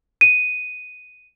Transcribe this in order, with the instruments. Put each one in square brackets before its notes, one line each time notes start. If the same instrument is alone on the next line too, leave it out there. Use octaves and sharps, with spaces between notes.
[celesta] D#7